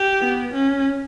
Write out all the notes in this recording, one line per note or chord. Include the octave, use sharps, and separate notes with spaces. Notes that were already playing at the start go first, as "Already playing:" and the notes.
Already playing: G4
B3
C#4